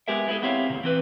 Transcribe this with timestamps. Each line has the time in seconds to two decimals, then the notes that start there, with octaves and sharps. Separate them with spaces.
0.08 G#3 B3 G4 G#4 A#4 E5
0.28 B3 E4 F#4 G#4 A4
0.42 B3 C4 E4 G4 C#5 F5
0.70 D2 C3
0.83 E3 C4 B4